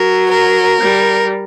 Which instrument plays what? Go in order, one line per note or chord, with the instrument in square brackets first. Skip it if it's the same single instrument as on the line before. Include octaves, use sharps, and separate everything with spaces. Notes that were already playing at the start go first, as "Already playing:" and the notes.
Already playing: [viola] F#3 [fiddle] A#4
[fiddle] A#4
[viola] G3